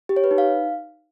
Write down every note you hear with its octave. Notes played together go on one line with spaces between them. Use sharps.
G4
C#5
B4
D#4
F5